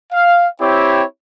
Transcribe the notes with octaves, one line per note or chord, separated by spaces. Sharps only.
F5
C4 E4 G4 C#5